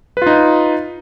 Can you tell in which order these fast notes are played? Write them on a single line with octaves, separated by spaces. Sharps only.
B4 F4 D#4